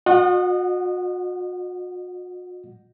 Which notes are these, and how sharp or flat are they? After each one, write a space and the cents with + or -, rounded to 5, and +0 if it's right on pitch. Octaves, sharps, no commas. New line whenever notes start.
F#4 -45 D#5 -30 F#5 +0